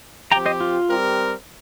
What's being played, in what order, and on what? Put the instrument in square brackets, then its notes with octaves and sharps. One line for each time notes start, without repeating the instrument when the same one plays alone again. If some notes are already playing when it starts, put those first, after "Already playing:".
[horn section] F3 C4 G4 [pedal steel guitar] G5 A#5
[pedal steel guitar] C5 D#5
F4
[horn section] G3 C4 G4 A#4